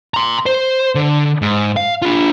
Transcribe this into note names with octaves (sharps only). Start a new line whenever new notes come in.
A#5 C6
C5
D3
G#2
F5
D4 F4